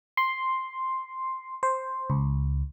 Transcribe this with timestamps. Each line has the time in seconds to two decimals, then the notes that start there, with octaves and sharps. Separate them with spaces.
0.17 C6
1.63 C5
2.10 C#2